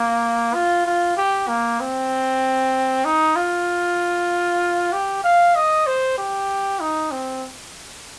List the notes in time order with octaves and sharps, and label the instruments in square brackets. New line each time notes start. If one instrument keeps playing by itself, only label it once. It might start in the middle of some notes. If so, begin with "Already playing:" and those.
Already playing: [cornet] A#3
F4
F4
G4
A#3
C4
D#4
F4
G4
F5
D#5
C5
G4
D#4
C4